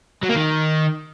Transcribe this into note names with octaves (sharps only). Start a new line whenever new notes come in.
F#3
A#3
D#3